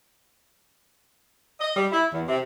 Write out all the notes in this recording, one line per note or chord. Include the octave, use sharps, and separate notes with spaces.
D#5
G3
E4
E2
C3